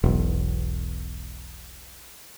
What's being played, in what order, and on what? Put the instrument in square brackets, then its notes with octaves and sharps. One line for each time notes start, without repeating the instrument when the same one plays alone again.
[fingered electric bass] E1 B1